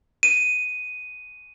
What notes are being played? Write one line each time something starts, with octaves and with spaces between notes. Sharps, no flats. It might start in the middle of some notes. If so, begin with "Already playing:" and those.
D#7